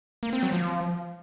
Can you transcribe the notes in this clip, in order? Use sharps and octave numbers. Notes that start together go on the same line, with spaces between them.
A#3
C4
F#3
F3